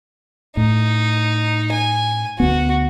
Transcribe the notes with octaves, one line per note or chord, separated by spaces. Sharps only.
A2 D#4
G#5
D2 B3 F#4